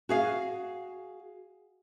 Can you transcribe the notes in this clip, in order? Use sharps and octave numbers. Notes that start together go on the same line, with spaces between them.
F#4 G#4 F5